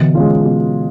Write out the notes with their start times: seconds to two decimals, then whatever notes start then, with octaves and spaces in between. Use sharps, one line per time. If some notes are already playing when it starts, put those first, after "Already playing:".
Already playing: B2 D3 E3
0.15 G#3 C#4 F4
0.45 B2